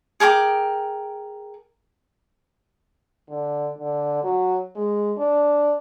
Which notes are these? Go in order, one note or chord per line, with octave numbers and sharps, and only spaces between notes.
G#4 A#4 G5 D6
D3
D3
F#3
G#3
D4